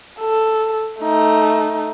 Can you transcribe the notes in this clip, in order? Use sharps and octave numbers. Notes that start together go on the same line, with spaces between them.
A4
A3 D#4